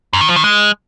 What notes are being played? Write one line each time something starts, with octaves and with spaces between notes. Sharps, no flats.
F#2
D#3
F3
D#3
G#3